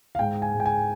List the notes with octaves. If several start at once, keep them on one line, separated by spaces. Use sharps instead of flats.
F5
G#2 G5
G#5
G#2
G5
G#5